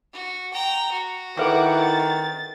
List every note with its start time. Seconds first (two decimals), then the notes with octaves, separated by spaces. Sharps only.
0.13 F#4
0.53 G5 A#5
0.92 F#4
1.37 D#3 E4 A4 B4 F#5 C#6 D6
1.79 A6